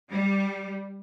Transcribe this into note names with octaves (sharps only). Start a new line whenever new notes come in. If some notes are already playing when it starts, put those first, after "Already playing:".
G3